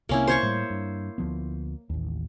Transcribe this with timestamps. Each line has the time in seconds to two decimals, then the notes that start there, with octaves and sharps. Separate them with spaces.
0.09 C2 C3 A#3 C4 C#4 E4
0.27 C5 C#5 C#6
0.43 A2 G3 A3
0.70 G2
1.18 D2 F3 B3
1.90 A1 D#2